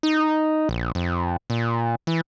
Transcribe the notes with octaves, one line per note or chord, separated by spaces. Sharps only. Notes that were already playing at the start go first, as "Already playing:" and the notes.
D#4
A#1
F2
A#2
E3